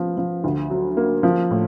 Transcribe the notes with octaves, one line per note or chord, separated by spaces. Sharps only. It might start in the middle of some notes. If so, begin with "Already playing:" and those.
Already playing: F3 B3
F3
D2
F#3
A#3
F3
A2